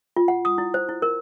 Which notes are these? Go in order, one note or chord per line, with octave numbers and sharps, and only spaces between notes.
F4
F#5
D#6
E4
C5
E4
A#4